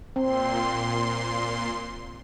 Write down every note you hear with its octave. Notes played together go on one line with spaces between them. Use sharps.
A#2 C4 C6